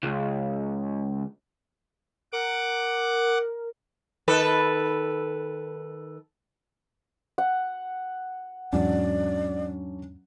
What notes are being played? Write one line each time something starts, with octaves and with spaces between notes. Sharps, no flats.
C#2
A#4 F#5 D6
D#3 A4 B4
F#5
E2 G#2 F#3 C#4 D4 D5